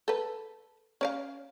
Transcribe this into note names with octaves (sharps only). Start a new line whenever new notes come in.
A4 B4
C#4 D5 F5